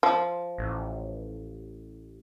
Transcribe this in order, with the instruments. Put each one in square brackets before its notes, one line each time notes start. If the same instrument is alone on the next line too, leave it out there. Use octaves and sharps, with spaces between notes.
[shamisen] F3
[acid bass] A1